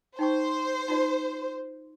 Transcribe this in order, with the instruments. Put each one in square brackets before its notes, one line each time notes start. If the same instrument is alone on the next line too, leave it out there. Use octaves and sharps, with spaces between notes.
[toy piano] D#4 G5 C#6 [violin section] C5
[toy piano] D#4 F4 D5